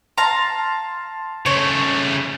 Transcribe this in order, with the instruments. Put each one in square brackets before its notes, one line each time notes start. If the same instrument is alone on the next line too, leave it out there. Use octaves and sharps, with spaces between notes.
[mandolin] F5 A#5 [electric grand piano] A5 C6
[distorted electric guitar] C#3 A3 [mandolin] C#5